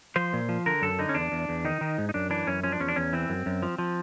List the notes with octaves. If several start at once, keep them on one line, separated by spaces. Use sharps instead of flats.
F3 C5
A#2
F3
D3 A#4
F#2 A4
D3 D#4
C#4
E2 D4
E2
E2
D#3 D#4
D#3
G#2
D#4
F#2 D4
E3 D4
F#2 C#4
F3 C#4
D4
E2 C#4
D4
E2 C#4
E3 C4
F#2
F#2
F3
F3